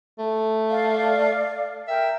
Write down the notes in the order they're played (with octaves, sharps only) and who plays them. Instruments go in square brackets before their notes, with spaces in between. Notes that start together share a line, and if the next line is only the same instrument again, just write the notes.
[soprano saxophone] A3
[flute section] D5 F5
[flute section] A#4 G5 [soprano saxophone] E5